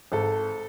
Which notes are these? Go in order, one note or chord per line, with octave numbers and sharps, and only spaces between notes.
G#1 A4